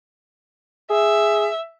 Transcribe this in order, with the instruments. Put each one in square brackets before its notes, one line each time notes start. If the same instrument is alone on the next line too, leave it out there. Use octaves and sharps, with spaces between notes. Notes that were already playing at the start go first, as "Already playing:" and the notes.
[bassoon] G#4 [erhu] E5